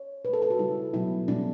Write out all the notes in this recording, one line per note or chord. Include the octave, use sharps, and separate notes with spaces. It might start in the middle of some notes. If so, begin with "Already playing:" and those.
Already playing: C#5
B2 A3 A4 B4
A4
F#4
C#3 G3 E4
B2 F#3 A3 E4
B2 G3 D4